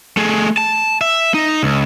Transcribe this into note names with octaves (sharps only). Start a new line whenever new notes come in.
A3 G#4
A5
E5
D#4
C#2